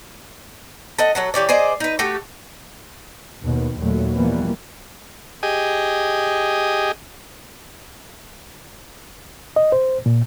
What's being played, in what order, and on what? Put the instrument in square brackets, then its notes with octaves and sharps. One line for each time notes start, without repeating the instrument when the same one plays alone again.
[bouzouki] A4 D#5 F#5
F#3 A4 F#5
E3 G4 C#5 D5
G#4 C5 D5 D#5
D#4 B4
A3 F#4 G4 A4
[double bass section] D#2 B2 D#3
D#2 A#2 F#3 A3
B2 E3 F3 G3 A#3 B3
[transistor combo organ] G4 G#4 D#5
[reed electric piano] D#5
C5
A#2